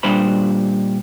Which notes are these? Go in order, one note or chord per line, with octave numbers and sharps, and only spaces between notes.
A#2 G3 D4 C5 B5